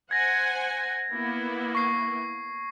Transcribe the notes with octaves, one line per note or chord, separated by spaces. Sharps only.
C5 F#5 G#5 G#6 A#6
A#3 B3 E4
C#6 C7